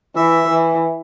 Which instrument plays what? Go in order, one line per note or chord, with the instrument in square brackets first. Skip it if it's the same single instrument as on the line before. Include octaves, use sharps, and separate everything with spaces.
[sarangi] E3 [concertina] E5
[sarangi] E3